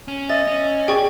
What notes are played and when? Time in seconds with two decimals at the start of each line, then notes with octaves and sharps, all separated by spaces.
0.08 C#4
0.29 D#5 E5 A6
0.47 C#4
0.88 G#4 D5 G5 C#6